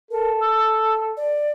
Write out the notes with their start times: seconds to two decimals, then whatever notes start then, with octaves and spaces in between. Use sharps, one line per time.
0.11 A4 A#4
0.41 E6
1.17 D5